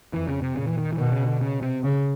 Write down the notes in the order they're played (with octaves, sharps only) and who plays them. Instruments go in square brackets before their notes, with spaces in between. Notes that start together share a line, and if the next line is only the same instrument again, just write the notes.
[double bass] F2 [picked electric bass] E3
[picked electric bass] C#3
C3
[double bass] A#2 [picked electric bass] C#3
[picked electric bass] E3
D#3
E3
[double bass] B2 [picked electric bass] D#3
[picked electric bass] C#3
D3
C#3
C3
[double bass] C#3